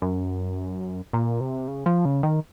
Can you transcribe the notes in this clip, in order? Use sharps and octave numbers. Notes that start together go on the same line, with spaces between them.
F#2
A#2
C3
C#3
F3
C#3
D#3